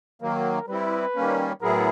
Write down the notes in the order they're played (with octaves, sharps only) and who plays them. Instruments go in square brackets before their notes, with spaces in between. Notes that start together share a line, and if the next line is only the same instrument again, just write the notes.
[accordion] D#3 F#3 A#3 [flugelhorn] A#4
[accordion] G3 C4 E4 [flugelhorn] B4
[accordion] D#3 G3 A#3 C#4
[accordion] A2 F#3 B3 E4 G#4 [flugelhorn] A#4